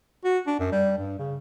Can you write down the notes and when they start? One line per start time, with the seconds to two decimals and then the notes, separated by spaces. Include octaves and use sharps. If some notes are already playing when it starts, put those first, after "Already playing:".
0.25 F#4
0.47 D4
0.59 F#2
0.72 G3
0.98 G2
1.19 C#3